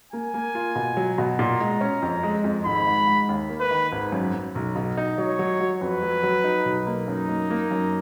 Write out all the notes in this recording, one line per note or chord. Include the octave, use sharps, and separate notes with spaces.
A#3 G#5
A#3
F4
B2
F#3
B2
A#2 A#5
G#3
C#4
F2
G#3
F2
G#1 B5
G#2
G#2
D#2
A#3
B4
D#3
G#1
F#2
F#2
B1
B2
D#4
F#3 C#5
F#3
F#3
F2 B4
F#3
F#3
D#4
B1
A#3
F#2 D#4
A#3
A#3
F#2